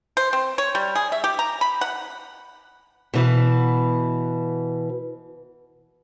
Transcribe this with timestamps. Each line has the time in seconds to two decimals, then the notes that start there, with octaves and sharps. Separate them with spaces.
0.17 C5
0.33 C4
0.58 C#5
0.75 G3
0.95 G#4
1.12 E5
1.24 G4
1.39 A#5
1.61 B5
1.81 F#5
3.14 B2 E3